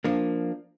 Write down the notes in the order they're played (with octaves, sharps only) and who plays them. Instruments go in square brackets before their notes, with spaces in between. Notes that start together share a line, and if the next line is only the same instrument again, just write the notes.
[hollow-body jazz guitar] F3 A#3 D4